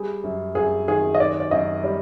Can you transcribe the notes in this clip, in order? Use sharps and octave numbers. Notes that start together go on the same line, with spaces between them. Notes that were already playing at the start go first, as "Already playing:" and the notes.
Already playing: G3 G#4
F#2
F#2 G#4
D#3 G#4
D#5
D#3 D5
D5
F#2 D#5
G3 D5